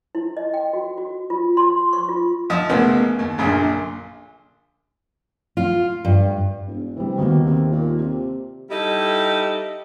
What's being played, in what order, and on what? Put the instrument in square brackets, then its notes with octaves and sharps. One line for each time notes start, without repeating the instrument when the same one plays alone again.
[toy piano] E4
D#5
G5
F#4
F#4
F4
C6
C#6
F4
[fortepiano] F3 D#5 E5 D#6
B1 A2 C#3 A#3 B3 F#5
D#2
A#1 F#2 A#2 D3
[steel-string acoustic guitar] F4
G2
[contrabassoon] E1
[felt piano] C3 G3 [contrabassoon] E3
[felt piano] D#2 D#3 A#3 [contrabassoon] B2
[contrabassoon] C3
A#2
C3
[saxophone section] G3 D#4 E4 G4 A4